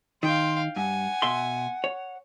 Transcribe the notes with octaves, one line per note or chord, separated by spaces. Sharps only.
D#3 F5 G5 C6
G2 F#5 G#5
B2 E5 C6
C#5